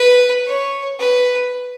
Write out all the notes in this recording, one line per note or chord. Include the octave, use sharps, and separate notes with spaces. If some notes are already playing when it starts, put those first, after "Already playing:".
Already playing: B4
C#5
B4